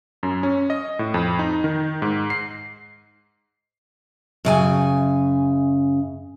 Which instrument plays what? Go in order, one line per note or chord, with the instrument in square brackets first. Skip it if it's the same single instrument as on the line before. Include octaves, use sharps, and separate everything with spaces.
[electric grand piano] F#2
C#4
D#5
A2
F2
D#4
D#3
G#2
C7
[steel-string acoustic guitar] F#2 C#3 G#5